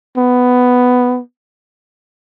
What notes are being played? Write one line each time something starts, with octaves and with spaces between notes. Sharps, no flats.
B3